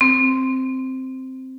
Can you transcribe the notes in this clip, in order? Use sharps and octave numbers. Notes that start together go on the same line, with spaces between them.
C4